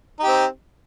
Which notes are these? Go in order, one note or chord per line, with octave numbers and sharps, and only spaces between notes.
C4 D#4 G4